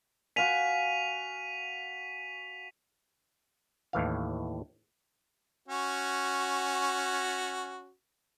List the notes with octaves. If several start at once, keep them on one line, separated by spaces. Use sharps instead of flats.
F#4 F5 G#5 B6 D#7 F7
D#2 A2 E3 F5
C#4 F#4